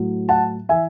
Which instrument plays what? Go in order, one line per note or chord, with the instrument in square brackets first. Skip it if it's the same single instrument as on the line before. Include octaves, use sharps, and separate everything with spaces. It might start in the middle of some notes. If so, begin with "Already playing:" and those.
Already playing: [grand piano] A2 F#3
F#5 A5
E3 E5 G#5